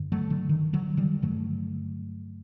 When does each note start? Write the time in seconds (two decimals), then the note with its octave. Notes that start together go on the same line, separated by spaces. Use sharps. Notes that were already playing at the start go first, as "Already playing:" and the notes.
Already playing: G2 D3
0.12 F#3 A3
0.30 D3
0.49 D#3
0.73 D3 F#3
0.97 D#3 G3
1.22 G2 D3 F#3 A3